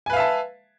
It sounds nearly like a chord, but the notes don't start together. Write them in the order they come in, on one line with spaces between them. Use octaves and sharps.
G#5 B4 F5 E5 A5